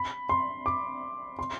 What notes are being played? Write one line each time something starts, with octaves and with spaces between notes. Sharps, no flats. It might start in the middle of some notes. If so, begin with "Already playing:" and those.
Already playing: B5
C6
D6
C6